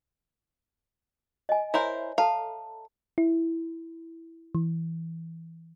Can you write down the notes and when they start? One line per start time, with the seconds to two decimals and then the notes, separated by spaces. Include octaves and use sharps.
1.49 D#5 G#5
1.74 E4 A#4 C5 C#5 E5
2.18 A4 F5 A5 A#5
3.18 E4
4.55 E3